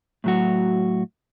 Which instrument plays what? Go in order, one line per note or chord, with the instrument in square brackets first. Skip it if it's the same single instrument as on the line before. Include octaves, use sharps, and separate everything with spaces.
[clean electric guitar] A2 F#3 F#4